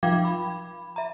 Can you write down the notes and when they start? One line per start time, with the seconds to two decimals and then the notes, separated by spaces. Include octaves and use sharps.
0.03 F3 F4 F5 G5 D6 G#6
0.25 B5
0.96 E5 A#5